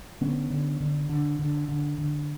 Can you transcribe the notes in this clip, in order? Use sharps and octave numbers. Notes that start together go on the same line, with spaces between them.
D3 B3 C#4
D3
D3
D3
D3
D3
D3